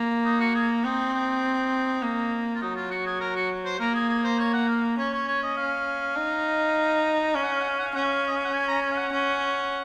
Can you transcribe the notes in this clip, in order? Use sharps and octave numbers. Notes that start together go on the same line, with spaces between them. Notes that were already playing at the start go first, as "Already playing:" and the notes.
Already playing: A#3
D#4
F#4
G#4
C4 D#4
D#4
A#3
F4
F#3 D#4
F4
F#4
G#4
A#4
F#4
C5
A#3 A#4
G#4
G#4
C5
C#5
F#5
F5
C#4 C#5
C#5
C#5
D#5
F5
D#4
C#4 F5
F#5
F5
F#5
F5
F#5
F5
C#4 F#5
F5
D#5
F5
F#5
G#5
A#5
G#5
F5
F#5
C#4